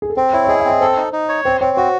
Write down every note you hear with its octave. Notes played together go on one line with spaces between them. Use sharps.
G#4
A4
C4 C5
E4 C#5
C#5
G#4 D#5
E5
C4 D#5
A4 C5
D#4
D#4
C#5
C4 C5
C4 C#5
F#4 C5